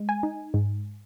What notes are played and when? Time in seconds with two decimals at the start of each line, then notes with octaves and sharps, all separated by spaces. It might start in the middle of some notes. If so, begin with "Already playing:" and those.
Already playing: G#3
0.09 G#5
0.23 D#4
0.54 G#2